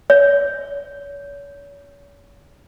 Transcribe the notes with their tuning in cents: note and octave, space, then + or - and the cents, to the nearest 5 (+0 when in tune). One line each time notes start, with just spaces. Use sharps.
C#5 +40